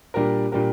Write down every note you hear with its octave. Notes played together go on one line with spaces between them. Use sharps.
A#2 G3 D4 G4 A#4
A#2 G3 D4 G4 A#4